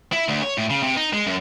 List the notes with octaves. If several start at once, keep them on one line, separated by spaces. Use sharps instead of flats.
E4
D2
C#5
A2
C#3
C3
D#4
G#3
F#2